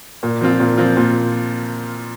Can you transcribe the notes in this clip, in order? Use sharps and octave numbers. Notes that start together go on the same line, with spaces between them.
A#2
F3 C4 F4
A#2
F3 C4 F4
A#2